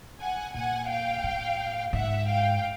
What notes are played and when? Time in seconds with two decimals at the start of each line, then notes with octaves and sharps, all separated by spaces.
0.19 F#5 G#5
0.54 A#2 F#5 G#5
0.88 F5 G5
1.24 A2
1.93 G#2 E5 F#5
2.27 F5 G5